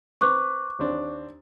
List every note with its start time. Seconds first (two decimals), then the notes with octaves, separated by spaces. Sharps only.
0.21 C4 B4 C#6 D6 F#6
0.79 D#2 C4 D4